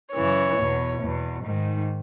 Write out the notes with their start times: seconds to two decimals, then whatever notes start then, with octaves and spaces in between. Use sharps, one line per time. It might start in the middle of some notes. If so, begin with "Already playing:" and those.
0.14 F#2 C#3 E3 C#5
0.58 E2 B2
1.02 E2 B2
1.45 G#2 D#3